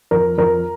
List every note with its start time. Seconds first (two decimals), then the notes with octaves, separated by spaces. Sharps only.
0.11 F2 A#4
0.38 F2 A#4